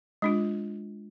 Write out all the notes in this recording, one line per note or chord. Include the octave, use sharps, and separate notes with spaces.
G#3 D4 F4